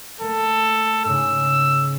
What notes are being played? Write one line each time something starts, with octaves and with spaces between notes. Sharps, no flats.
A3 A#3 A4
G#2 C#3 E6